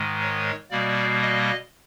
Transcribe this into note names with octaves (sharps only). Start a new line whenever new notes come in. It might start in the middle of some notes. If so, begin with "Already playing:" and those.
Already playing: G#2 D#3 G#3
C#5
B2 G3 A#3 D5
D#5